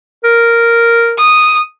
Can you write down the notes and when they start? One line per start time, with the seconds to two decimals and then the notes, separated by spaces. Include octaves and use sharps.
0.24 A#4
1.18 D#6